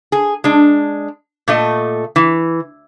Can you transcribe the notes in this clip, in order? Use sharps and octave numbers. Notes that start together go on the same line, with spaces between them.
G#4
G#3 D4
A#2 A3 D#5
E3